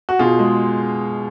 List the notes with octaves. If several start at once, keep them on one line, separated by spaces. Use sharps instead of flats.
F#4
B2 F4 G#4
G#3